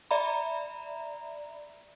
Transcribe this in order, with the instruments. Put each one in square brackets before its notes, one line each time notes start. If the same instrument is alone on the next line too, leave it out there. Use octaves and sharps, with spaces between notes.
[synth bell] D5 E5 A#5 B5